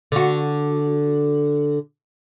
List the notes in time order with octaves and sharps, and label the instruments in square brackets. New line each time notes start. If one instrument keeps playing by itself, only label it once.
[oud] D3 F#4